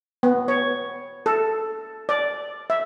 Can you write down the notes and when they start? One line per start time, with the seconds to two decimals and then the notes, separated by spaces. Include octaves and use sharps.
0.23 B3
0.48 C#5
1.26 A4
2.09 D5
2.70 E5